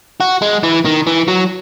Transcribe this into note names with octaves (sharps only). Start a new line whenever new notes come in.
F#4
G#3
E3
D#3
E3
F#3